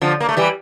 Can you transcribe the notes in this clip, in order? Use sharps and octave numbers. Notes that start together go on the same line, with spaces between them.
D3 F3
A#3
A3
E3 G3